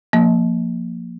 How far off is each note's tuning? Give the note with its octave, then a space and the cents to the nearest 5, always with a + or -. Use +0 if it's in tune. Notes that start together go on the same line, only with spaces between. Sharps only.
F3 +10 A#3 +0